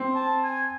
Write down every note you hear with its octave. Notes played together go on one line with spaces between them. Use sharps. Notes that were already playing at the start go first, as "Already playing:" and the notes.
Already playing: C4
A5
G#5